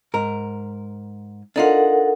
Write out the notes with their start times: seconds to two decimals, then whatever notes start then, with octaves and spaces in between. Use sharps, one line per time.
0.14 G#2 A#4
1.56 D4 D#4 F4 A4 A#4 F#5